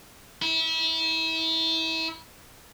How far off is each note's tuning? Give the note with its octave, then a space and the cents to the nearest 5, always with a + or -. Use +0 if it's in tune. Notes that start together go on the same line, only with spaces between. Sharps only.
E4 -30